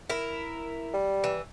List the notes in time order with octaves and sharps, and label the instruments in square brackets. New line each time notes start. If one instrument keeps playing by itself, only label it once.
[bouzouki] E4 A#4
[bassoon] G3
[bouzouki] E3